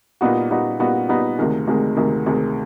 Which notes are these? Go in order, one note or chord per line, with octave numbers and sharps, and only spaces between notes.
A#2 G3 B3 D#4 F#4
A#2 G3 B3 D#4 F#4
A#2 G3 B3 D#4 F#4
A#2 G3 B3 D#4 F#4
D2 C3 D#3 G#3
D2 C3 D#3 G#3
D2 C3 D#3 G#3
D2 C3 D#3 G#3